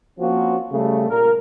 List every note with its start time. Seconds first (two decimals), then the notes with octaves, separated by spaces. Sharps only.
0.19 F3 A#3 C4 C#4 F#4
0.72 C#3 G3 A3
1.09 A#2 A#4